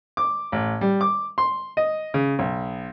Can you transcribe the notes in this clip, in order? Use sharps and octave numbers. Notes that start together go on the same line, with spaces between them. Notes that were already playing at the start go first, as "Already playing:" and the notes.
D6
A1
G3
D6
C6
D#5
C#3
B1